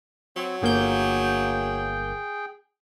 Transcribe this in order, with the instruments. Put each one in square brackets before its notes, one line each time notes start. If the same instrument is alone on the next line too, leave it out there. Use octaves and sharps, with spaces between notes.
[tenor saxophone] F#3 [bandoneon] C4 C#5
[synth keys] G1 A#3 G6 [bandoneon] G#4 G5